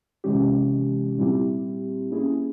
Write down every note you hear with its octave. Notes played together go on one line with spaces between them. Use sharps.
C3 E3 G#3 C#4 G4
A#2 G3 C4 E4 G4
A#3 C#4 E4 G#4